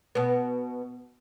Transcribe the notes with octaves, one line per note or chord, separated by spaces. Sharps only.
B2 B3